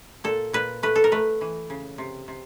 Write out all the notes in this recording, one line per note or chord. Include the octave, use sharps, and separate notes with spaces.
A#2 A4
A#2 B4
A3 B4
A4
A#4
A3 B4
E3
C#3
C3
C3